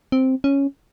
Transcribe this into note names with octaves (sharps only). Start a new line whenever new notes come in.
C4
C#4